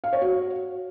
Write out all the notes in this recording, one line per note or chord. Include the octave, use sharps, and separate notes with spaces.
F5
C#5
F#4